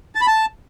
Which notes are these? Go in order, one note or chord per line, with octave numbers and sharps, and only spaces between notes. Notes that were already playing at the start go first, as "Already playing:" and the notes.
A5
B5
A5